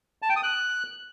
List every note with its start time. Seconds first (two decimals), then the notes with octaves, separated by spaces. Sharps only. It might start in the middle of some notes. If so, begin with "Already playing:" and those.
0.22 A5
0.29 G5
0.36 D#6
0.43 F#6